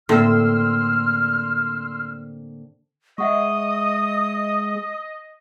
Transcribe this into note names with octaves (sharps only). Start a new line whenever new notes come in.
A2 D3 A#3 C4 C6 E6 F6
G#3 D#5 E5 F#5 C#6 D#6